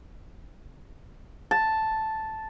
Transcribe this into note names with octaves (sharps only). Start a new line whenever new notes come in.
A5